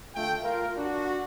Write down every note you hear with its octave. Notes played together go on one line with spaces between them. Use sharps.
D3 A3 F4 G5
F4 A#4
D4 F#4